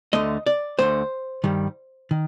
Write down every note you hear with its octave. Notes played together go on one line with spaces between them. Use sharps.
D2 D3 A3 D#5
D5
D2 D3 A3 C5
G2 D#3 G3
D#3